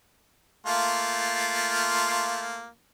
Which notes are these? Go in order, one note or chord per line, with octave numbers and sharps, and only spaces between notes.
A3 A#3 F4